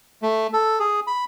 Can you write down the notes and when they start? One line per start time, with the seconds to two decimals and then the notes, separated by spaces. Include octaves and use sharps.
0.22 A3
0.53 A4
0.79 G#4
1.07 B5